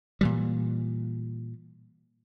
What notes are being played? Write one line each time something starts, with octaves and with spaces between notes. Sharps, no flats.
A#2 E3 G3